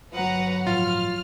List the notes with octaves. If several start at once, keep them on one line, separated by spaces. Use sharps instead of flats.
G1 F#3 B4 F#5 A#5
A2 F3 F4 F6